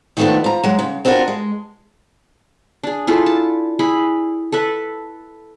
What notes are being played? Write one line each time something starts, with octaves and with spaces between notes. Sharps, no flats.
D#3 F3 G3 A3 B3 D4
F3 A#5
F#3 G#3
C#3
C4 D4 F4 F#4 A#4
G#3
D4 G#4
E4 F4 G#4 A4
A5
E4 G#4 B5
A4 B4 E5